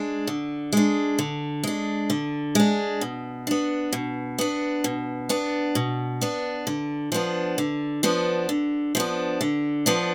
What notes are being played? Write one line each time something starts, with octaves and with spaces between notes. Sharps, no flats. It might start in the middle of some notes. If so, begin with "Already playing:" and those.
Already playing: G#3 D4
D3
G#3 D4
D3
G#3 D4
D3
G#3 D4
B2
B3 D4
B2
B3 D4
B2
B3 D4
B2
B3 D4
D3
F3 B3 D4
D3
F3 B3 D4
D3
F3 B3 D4
D3
F3 B3 D4